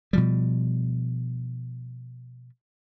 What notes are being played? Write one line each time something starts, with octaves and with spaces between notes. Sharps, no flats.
B2 F3 G3